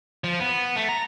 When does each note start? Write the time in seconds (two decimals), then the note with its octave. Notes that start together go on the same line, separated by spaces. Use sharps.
0.24 F3
0.40 B3
0.76 A3
0.89 A#5